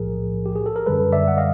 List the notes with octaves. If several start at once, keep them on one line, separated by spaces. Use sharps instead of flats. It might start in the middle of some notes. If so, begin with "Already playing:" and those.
Already playing: B1 A2 F3 G#4 A#4
G4
G#4
A4
A#4
F#2 D3 G3 A4 B4
D5 E5
F#5
D#5 F5